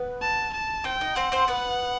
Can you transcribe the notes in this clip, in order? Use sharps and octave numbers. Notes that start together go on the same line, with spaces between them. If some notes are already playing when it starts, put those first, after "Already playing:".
Already playing: B3 B4
A5
A5
C4 C5 G5
D#4 D#5
C4 C5 F#5
C4 C5
B3 B4